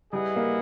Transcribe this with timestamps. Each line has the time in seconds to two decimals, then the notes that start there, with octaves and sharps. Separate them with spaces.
0.13 G3 E4 G#4 B4 D#5 F#5
0.36 A#3